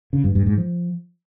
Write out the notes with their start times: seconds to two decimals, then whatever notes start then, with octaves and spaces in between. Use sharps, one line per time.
0.13 C#3
0.24 G2
0.35 G2
0.46 G#2
0.57 F3